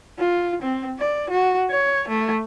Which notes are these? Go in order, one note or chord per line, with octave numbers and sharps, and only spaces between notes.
F4
C4
D5
F#4
C#5
A3